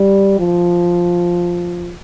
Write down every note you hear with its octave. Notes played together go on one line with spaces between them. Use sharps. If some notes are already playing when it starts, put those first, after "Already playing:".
Already playing: G3
F3